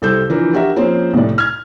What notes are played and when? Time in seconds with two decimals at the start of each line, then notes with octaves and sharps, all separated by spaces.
0.02 C2 G3 A4 C5 E6 G6
0.30 E3 F3 D4 A#4
0.53 D4 F#4 G4 A#4 E5
0.76 F3 A#3 C4 C#4 G#4 C5
1.13 C2 A2 A3 D5
1.38 F6 G#6